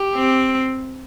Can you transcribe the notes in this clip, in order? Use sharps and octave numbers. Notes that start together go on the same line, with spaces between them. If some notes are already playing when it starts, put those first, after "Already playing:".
Already playing: G4
C4